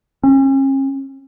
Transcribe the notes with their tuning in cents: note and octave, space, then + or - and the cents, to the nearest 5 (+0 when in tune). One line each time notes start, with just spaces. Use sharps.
C#4 -40